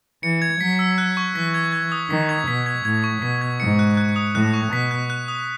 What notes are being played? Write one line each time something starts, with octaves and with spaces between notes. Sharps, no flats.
E3 C#7
G#6
F#3 B6
E6
F#6
C#6
E3 B6
G#6
G#6
D#6
D#3 B6
G#6
B2 B6
G#6
A2 G#6
C#6
B2 B6
G#6
G#2 C#7
F#6
F#6
D#6
A2 F#6
C#6
B2 B6
F#6
F#6
D#6